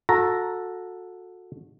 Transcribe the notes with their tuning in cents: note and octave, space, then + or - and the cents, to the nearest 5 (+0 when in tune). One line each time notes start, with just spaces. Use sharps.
F#4 -25 A4 +0 A#5 +0